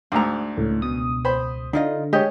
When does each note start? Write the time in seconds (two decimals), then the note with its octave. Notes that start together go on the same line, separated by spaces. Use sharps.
0.12 D2 G#2 D4 A#5
0.57 C#2 A2
0.82 B2 D#6
1.25 C5 B5
1.73 D3 D#4 F4 D#5
2.13 G#3 G4 C#5 D#5